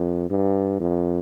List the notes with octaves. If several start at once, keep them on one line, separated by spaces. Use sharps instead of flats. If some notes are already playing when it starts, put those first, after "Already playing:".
Already playing: F2
G2
F2